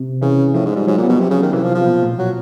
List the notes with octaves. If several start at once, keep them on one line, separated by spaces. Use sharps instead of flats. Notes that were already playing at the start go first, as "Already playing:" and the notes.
Already playing: C3
C#3 E3
A2 F3
G#2
G#2 G3
G#2 F#3
A#2
B3
B2
C3 F#3
C#3
D#3
C3 E3
F3
F3
B2
A#2
F#3